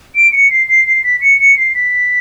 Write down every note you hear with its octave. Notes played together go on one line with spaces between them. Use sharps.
D7
C#7
C7
C7
C7
B6
C#7
C#7
C7
B6